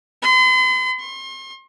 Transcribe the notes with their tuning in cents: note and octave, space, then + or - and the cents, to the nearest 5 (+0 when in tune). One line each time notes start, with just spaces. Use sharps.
C6 -45
C6 +40